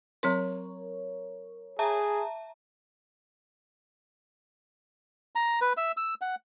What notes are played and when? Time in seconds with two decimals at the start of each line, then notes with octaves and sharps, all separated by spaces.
0.23 F#3 C4 A#4 C#5 C6
1.79 G#4 E5 A5 A#5
5.35 A#5
5.61 B4
5.77 E5
5.97 E6
6.21 F#5